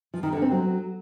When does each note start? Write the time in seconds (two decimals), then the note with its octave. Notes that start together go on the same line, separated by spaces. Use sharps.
0.14 F3
0.23 D#3
0.32 D3
0.42 C4
0.51 F#3